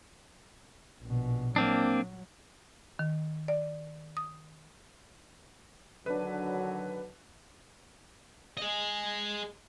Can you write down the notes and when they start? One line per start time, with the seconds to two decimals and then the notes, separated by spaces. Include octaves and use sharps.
1.03 A#1 B2
1.56 F#3 A#3 C4 D4
2.99 D#3
3.48 D5
4.17 D#6
6.06 D3 D#3 F#3 D4 B4
8.57 G#4 D#5